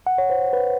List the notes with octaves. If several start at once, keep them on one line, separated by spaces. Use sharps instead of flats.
F#5
C#5
C5
B4